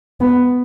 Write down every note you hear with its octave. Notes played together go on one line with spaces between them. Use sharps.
B3